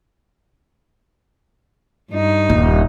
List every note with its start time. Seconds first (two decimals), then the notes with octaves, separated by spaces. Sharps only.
2.11 G2 D#4
2.50 D#1